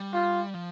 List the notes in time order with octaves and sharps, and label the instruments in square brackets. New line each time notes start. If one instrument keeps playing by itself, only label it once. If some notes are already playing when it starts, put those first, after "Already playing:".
Already playing: [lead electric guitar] G3
[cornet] F4
[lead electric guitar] F3